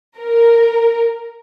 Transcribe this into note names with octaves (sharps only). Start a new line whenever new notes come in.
A#4